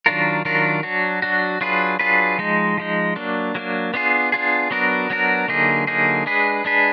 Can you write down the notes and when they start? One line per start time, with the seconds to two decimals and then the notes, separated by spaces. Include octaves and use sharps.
0.06 D#3 F#3 D4 F4 A#4
0.45 D#3 F#3 D4 F4 A#4
0.83 F#3 D4 F#4
1.22 F#3 D4 F#4
1.61 F#3 D4 F4 G#4 B4
1.99 F#3 D4 F4 G#4 B4
2.38 F3 G#3 D#4
2.77 F3 G#3 D#4
3.16 F#3 A#3 D4
3.55 F#3 A#3 D4
3.94 B3 D4 F4 G#4
4.32 B3 D4 F4 G#4
4.71 F#3 B3 D4 F#4 A#4
5.10 F#3 B3 D4 F#4 A#4
5.48 D3 F#3 A#3 D#4 G#4
5.87 D3 F#3 A#3 D#4 G#4
6.26 G#3 D4 G#4 B4
6.65 G#3 D4 G#4 B4